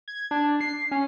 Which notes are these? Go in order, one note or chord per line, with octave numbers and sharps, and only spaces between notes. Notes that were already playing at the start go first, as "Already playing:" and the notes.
G#6
D4
C7
C#4